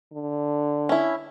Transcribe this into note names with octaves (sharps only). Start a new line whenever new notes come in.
D3
C#4 E4